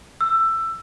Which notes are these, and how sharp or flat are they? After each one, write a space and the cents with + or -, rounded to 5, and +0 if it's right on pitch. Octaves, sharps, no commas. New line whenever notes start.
E6 +15